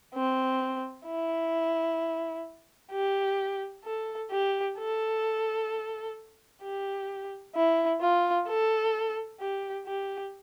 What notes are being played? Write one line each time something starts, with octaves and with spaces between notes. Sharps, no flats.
C4
E4
G4
A4
G4
A4
G4
E4
F4
A4
G4
G4